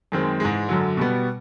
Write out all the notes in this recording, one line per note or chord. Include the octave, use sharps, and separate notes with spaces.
F#2 D#3 G#3 C4
G#2 E3 G#3
F#2 D3 F#3
B2 G3 B3